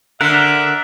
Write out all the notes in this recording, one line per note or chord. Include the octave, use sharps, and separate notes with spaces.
D3 A#4 E5 F#5